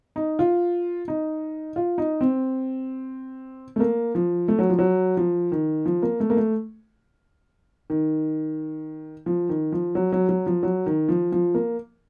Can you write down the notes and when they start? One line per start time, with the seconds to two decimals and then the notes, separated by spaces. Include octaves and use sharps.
0.16 D#4
0.39 F4
1.08 D#4
1.76 F4
1.98 D#4
2.21 C4
3.76 A3
3.80 A#3
4.15 F3
4.48 A3
4.59 F#3
4.69 F3
4.79 F#3
5.17 F3
5.52 D#3
5.86 F3
6.02 A#3
6.20 A3
6.30 A#3
6.37 A3
7.90 D#3
9.26 F3
9.49 D#3
9.72 F3
9.95 F#3
10.12 F#3
10.29 F#3
10.46 F3
10.63 F#3
10.86 D#3
11.09 F3
11.32 F3
11.55 A#3